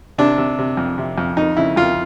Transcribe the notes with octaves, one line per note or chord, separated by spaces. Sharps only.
C3 D4
C3
C3
F2
C3
F2
F2 D#4
C#3 E4
F2 F4